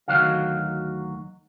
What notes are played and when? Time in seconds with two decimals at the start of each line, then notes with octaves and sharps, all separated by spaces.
0.08 D2 C3 D#3 F#3 F#4 F5